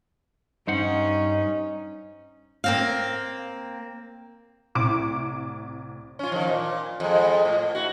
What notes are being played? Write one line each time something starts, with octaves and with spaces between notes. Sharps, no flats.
G2 C#4 D#4 C5 F#5
A#3 C4 F5
C2 A2 C#6 D6 D7
C#4 F4
D#3 F3
A#2
F2 G#3
A2
E4 F#4